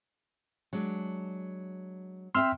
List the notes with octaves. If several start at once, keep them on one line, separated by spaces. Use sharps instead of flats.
F#3 G#3 D4
C4 E5 G5 C6 E6 F6